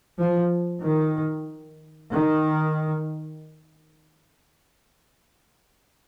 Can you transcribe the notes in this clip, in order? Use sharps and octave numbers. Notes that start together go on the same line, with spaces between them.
F3
D#3
D#3